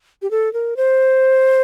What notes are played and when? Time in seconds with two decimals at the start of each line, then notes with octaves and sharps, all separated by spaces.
0.22 G4
0.31 A4
0.53 A#4
0.77 C5